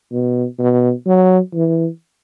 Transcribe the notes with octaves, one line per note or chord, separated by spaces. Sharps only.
B2
B2
F#3
E3